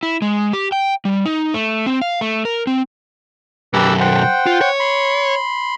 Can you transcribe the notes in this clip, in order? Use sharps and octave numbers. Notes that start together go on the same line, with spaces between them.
E4
G#3
G4
G5
G3
D#4
A3
C4
F5
A3
A#4
C4
B1 F#2 G4 B4 E6
C5 F#5 G5
F4
C#5
B5 C6